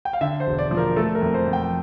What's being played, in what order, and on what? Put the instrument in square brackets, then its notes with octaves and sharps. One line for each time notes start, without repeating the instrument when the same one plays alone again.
[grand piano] G5
F5
D3 E5
C5
E1
D5
F3
A#4
A3 A4
A#4
F2
C5
F2
G5